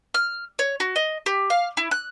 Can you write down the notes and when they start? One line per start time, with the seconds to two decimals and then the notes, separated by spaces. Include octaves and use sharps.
0.14 F6
0.59 C#5
0.80 F#4
0.96 D#5
1.26 G4
1.50 F5
1.77 E4
1.91 F#6